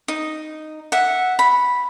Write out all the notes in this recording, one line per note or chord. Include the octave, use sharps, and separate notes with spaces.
D#4
E5 F#5
B5